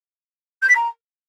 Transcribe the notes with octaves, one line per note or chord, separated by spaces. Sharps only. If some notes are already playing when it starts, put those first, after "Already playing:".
G6
B6
A#5